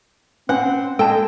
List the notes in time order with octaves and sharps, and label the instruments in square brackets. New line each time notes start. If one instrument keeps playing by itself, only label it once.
[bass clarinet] C4 [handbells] C#4 B4 [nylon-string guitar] F#5
[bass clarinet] G#3 [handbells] A4 A5 [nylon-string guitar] G5